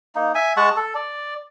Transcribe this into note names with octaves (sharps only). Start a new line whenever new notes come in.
A#3 D#4
E5 G#5
G#3 F#5 A5 C#6
A4
D5